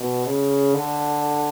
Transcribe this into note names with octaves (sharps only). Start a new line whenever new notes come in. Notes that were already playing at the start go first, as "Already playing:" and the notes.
Already playing: B2
C#3
D3